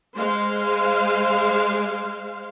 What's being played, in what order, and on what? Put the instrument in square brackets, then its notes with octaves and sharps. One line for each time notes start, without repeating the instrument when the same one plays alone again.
[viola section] G#3 C5 F5